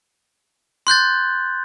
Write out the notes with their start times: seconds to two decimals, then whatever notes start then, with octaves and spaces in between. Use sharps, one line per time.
0.87 C6 F#6 G6 A6